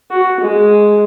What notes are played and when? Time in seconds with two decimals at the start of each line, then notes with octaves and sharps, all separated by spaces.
0.11 F#4
0.40 G#3